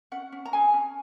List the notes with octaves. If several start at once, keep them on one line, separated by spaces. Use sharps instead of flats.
C#4 F#5
C#4
A#5
G#4 G#5
C#4